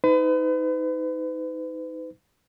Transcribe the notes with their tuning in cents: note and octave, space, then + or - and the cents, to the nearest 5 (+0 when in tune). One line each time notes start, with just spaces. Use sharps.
D#4 +25 B4 +40